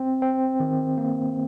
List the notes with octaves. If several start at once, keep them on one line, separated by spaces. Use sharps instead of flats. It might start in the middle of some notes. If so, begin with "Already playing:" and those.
Already playing: C4
C4
D#3
A#3